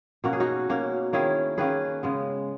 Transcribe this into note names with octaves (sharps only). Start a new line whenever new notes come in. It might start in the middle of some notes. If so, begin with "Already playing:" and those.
B2 A#3 C#4 F#4
G#4
D#4 F#4
B2 A#3 C#4
D#3 A#3 C#4 E4 G#4
D#3 A#3 C#4 G#4 B4
C#3 G#3 B3